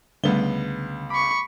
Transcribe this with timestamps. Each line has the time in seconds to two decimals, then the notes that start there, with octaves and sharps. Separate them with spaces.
0.24 C#2 D3 G3 A3 B3 G7
1.10 B5 C#6 D6